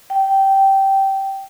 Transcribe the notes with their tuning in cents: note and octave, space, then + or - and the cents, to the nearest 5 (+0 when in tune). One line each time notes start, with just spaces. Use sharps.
G5 -15